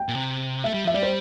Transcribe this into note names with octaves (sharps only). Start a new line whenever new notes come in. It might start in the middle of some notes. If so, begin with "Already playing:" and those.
Already playing: G5
A#2
C3
A3 E5
G3
F3 E5
G3 D5
C5